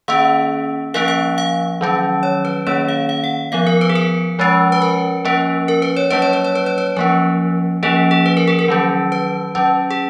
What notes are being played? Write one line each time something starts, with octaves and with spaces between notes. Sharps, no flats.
D#3 A#3 C#4 F5
F3 A#3 C#4 F5
F5
F5
D#3 F#3 C#4
C#5
B4
D#3 A#3 C#4 C#5
F5
F5
F#5
F3 B3 F5
A#4
B4
G#4
A#4
F3 G#3 C#4
B4
A#4
F3 A#3 C#4
A#4
B4
C#5
F#3 A#3 C#4 B4
C#5
B4
C#5
B4
C#5
B4
F3 A#3 C#4 A#4
F3 A#3 C#4 G#4
G#4
B4
A#4
G#4
A#4
D#3 F#3 C#4
B4
F#3 C#4
G#4